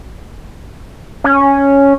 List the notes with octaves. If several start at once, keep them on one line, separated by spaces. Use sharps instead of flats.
C#4